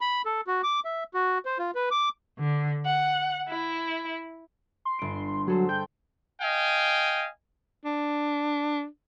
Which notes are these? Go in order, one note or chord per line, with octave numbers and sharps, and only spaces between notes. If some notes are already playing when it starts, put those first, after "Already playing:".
B5
A4
F#4
D6
E5
F#4
C5
F4
B4
D6
D3
F#5
E4
C6
G1 D7
F#3 G#4 A4 C5
G5 G6
D#5 F5 G5 G#5
D4